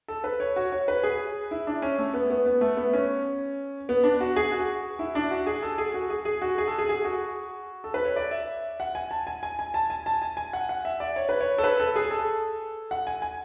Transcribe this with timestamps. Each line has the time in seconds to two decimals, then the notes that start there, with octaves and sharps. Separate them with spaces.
0.08 A4
0.24 B4
0.40 C#5
0.56 F#4
0.72 C#5
0.88 B4
1.03 G#4
1.51 E4
1.67 D4
1.82 C#4
1.98 A3
2.14 B3
2.30 B3
2.46 B3
2.61 A3
2.77 B3
2.93 C#4
3.89 B3
4.04 D4
4.20 F#4
4.36 G#4
4.52 F#4
4.99 E4
5.15 D4
5.31 F#4
5.46 G#4
5.63 A4
5.78 G#4
5.94 F#4
6.10 G#4
6.25 G#4
6.42 F#4
6.58 G#4
6.68 A4
6.78 G#4
6.89 G#4
7.04 F#4
7.84 A4
7.94 B4
8.05 C#5
8.16 D5
8.31 E5
8.80 F#5
8.95 G#5
9.11 A5
9.27 G#5
9.43 G#5
9.59 G#5
9.74 A5
9.90 G#5
10.06 A5
10.22 G#5
10.37 G#5
10.53 F#5
10.69 F#5
10.85 E5
11.00 D5
11.16 C#5
11.29 B4
11.41 C#5
11.58 A4
11.64 B4
11.80 A4
11.96 G#4
12.11 A4
12.91 F#5
13.07 G#5
13.22 G#5